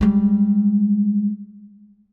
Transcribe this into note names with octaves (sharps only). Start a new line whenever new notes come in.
G3 G#3